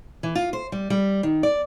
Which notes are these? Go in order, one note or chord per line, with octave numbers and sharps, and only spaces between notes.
E3
F4
C5
G3
G3
D#3
D5